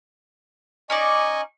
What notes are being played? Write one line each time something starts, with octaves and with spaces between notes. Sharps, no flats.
C#4 D#4 D5 D#5 G#5 C#6